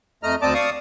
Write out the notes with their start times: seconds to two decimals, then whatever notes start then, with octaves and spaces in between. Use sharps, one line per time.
0.23 F2 A3 D#5 A#5 F6
0.42 D2 C4 D5 D#5 A5 D6
0.54 D5 F5 C#6 D#6